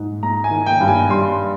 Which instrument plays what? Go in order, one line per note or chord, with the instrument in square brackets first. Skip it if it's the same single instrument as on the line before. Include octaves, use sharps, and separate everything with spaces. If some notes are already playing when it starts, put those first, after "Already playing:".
Already playing: [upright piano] G#2
G#3 A#5
G#5
D#3
G5
G2
G#5
G3 C6